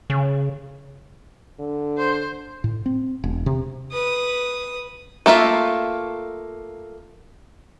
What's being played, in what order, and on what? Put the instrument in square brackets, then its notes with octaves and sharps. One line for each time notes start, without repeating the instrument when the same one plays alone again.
[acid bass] C#3
[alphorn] D3
[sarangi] C5
[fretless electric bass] A2
C4
E1
C3
[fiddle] B4 D#6
[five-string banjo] A3 A#3 F4 E5